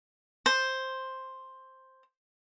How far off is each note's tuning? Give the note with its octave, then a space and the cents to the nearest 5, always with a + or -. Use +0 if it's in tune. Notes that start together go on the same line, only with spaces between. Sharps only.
C5 +5